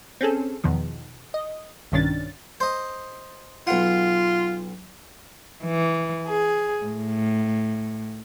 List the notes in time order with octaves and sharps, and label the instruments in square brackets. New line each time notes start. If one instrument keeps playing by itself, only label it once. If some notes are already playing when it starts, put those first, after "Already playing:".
[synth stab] C4 C#4 G#4 A4
E2 B2 D#3 F3
D#5
B1 G2 D#3 C#4 D4 A6
[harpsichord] C5 D#5
[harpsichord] B1 F#5 [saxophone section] F4
[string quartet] E3
G#4
A2